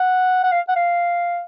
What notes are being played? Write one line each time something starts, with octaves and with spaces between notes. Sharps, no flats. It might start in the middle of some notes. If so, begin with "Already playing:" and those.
Already playing: F#5
F#5
F5
F#5
F5